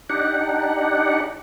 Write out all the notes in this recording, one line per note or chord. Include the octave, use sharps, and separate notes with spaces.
D4 D#4 G4 F#5